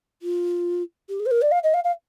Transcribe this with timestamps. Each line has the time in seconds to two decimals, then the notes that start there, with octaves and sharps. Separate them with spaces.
0.22 F4
1.09 G4
1.19 G#4
1.26 C5
1.31 A#4
1.41 D5
1.51 F5
1.63 D#5
1.74 F5
1.84 F5